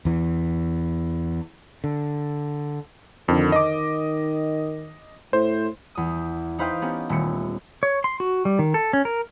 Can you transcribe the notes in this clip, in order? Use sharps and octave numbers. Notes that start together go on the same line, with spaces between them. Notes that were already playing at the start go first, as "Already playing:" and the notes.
E2 E3
D3
F2 D3 D#3
D#5 D6
A2 C5
E2 D#6
D#4 B4 C5 F5 G5 D#6
B3 C#4 D#4 G4
D#1 A3 C#7
C#5
C6
F#4
G3
D#3
A4
C#4
A#4